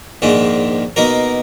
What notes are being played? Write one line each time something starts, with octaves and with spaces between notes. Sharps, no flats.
A#1 G#2 D#3 G#3 D4
B2 A#3 D#4 A#4